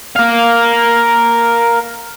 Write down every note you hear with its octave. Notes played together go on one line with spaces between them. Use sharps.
A#4 F5